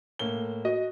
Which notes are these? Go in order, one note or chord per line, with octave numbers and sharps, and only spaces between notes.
A2 A#3 G7
F#4 D#5